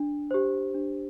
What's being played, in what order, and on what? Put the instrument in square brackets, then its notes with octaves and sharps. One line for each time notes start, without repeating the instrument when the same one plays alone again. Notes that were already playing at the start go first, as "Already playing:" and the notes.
Already playing: [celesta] D4
G4 C5
D4